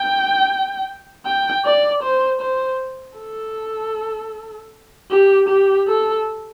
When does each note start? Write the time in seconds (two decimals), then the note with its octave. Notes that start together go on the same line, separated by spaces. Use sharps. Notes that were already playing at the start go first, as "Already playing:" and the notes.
Already playing: G5
1.26 G5
1.65 D5
2.03 C5
2.41 C5
3.18 A4
5.11 G4
5.48 G4
5.87 A4